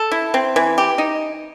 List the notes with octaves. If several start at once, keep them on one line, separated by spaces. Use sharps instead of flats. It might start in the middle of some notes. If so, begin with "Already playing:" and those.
Already playing: A4
E4
C4
E3
G4
D#4